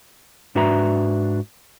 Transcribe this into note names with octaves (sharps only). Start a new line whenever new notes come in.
G#2 D4 F#4 B4 E5 A#5